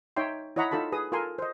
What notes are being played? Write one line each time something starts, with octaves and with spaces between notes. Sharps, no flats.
D#4 C#5 E5 G5 C6
E4 C#5 D#5 F#5 A#5 B5
D#4 F4 A4 A5 B5
G#4 B4 D#6
F4 A4 A#4 G#5 C6
C5 D#5